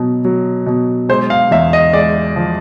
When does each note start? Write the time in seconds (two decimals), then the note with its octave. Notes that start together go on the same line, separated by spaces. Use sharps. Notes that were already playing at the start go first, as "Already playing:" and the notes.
Already playing: B2 F#3
0.25 F#3
0.66 B2
1.09 G#3 C5
1.30 F5
1.51 E2 E5
1.73 D#5
1.93 G#3 D5
2.36 F3